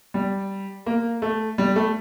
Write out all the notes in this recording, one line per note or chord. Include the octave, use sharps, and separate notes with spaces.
G3
A#3
A3
G3
A3